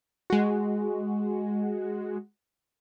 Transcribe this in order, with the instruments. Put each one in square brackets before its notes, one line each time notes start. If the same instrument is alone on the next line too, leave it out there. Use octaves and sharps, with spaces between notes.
[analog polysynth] G#3 F#4